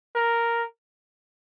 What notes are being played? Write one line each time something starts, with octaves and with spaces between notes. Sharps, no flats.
A#4